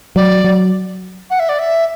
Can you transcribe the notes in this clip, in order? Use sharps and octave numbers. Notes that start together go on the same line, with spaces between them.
F#3 D5
F#3
F#5
E5
D5
E5